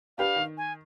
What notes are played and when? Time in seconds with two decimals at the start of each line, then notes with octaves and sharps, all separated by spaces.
0.18 D4 G4 B4 F5
0.36 D#3
0.57 G#5